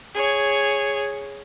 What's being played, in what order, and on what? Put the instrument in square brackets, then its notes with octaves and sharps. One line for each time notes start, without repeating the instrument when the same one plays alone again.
[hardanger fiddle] G#4 C#5